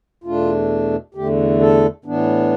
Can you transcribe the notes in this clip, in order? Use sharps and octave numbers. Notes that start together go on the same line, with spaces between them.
E2 B2 A3 D4 F4
E2 D3 A3 G4
A4
A2 E3 B3 D4